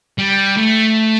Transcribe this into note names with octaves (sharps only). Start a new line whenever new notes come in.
G3
A3